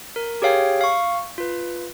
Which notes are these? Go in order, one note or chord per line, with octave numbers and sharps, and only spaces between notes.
A#4
G4 G#4 C#5 F5 G5
F5 C#6
F4 B4